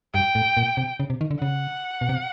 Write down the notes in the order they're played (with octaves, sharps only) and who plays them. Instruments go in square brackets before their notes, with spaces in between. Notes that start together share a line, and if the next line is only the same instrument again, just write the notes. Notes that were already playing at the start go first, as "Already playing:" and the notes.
[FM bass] G2 [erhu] G5
[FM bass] A2
A#2
C3
C#3
C3
D#3
D3
[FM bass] C#3 [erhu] F#5
[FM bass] B2
C3